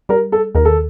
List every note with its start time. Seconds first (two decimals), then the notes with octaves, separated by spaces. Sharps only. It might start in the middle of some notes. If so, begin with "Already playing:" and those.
0.09 G3 A#4
0.32 A4
0.55 D#2 A#4
0.65 A4